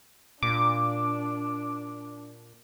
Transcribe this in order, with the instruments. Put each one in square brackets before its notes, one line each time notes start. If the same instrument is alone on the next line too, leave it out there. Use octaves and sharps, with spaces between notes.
[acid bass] A#2 [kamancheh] D4 [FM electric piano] D6